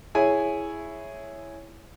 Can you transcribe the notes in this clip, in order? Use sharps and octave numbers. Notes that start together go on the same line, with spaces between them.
E4 G#4 C#5 G#5